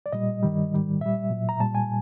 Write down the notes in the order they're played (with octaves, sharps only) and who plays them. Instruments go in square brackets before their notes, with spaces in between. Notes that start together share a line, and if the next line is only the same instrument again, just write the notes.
[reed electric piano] D5
A#2 G3 D#5
G2 D#3 G3
G#2 D#3 G3
A#2 G3 E5
A#2 F#3
A#5
A#2 G3 A5
G#5